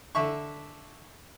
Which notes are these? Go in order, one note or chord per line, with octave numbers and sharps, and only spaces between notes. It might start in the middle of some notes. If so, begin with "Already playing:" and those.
D3 E5 C#6